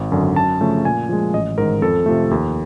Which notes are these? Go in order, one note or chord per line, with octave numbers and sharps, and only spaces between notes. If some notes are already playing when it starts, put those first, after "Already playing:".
Already playing: G#1
F#2 D3
F#2 A5
C#3 F3 A3 C#4
A#2 G#5
F3 G#3
A1 D#5
G#2 D#3 A#4
F2 A4
C3 F3 A3
D#2